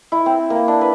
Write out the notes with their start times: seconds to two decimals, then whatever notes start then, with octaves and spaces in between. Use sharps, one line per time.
0.12 E4
0.26 C4
0.50 A#3
0.68 D4
0.81 B4